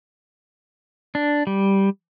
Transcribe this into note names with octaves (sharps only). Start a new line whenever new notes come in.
D4
G3